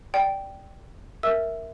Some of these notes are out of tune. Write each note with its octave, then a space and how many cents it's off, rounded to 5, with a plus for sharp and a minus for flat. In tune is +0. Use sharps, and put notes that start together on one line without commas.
D5 +0 G5 -5
A#4 +0 E5 -5 E6 +0